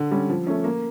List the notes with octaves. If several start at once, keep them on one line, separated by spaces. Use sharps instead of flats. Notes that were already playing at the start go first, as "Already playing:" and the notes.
Already playing: D3
G3 C#4
F3
A3 C#4
A#3